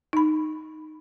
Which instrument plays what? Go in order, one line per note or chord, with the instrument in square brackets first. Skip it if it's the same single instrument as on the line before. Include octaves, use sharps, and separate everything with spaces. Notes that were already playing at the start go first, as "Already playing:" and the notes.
[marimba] D#4 B5